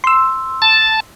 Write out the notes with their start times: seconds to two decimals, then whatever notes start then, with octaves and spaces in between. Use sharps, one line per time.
0.04 C6 E6
0.62 A5